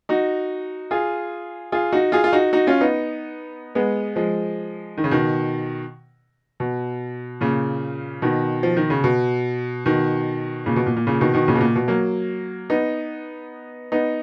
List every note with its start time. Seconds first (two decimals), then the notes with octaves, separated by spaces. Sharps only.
0.09 D#4 F#4
0.91 F4 G#4
1.72 F4 G#4
1.93 D#4 F#4
2.12 F4 G#4
2.24 F4
2.32 D#4 F#4
2.53 D#4 F#4
2.67 C#4 F4
2.81 B3 D#4
3.75 G#3 B3
4.16 F3 G#3
4.98 D#3
5.04 C#3
5.11 B2 D#3
6.60 B2
7.41 A#2 C#3
8.22 B2 D#3
8.63 F3
8.77 D#3
8.90 C#3
9.04 B2
9.86 B2 D#3
10.66 A#2 C#3
10.76 B2
10.86 A#2
10.97 A#2
11.07 A#2 C#3
11.21 B2 D#3
11.34 B2 D#3
11.48 A#2 C#3
11.55 B2
11.61 A#2
11.75 B2
11.88 F#3 A#3
12.70 B3 D#4
13.92 B3 D#4